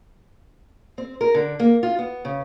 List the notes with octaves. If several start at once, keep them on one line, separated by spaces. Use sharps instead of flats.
C4
A#4
D3
A#3
F4
B3
C#3